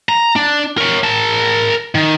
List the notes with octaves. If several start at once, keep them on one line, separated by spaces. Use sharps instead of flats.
A#5
D4
A#4 C#5
A#4 A5
D#3